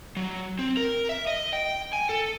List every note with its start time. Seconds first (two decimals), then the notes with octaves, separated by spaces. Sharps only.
0.17 F#3
0.59 C4
0.77 A#4
1.09 E5
1.27 D#5
1.53 G5
1.93 G#5
2.09 A4